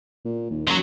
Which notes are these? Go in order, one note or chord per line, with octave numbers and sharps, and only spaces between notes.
A#2
D#2
F#2 F3 F#3